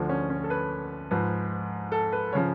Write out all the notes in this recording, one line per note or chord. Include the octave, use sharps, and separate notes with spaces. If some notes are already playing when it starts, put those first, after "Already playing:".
Already playing: D2 D3 F3
C#4
C#4
A4
B4
G#2 F3 B4
A4
B4
C#3 F3 C#5